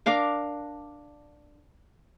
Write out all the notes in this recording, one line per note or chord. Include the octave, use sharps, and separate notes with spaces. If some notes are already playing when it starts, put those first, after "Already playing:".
D4 A#4 F5 D6